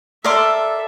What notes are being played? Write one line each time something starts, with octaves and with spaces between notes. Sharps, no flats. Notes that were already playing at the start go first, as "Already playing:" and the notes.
A4 A#4 D5 E5 C6 E6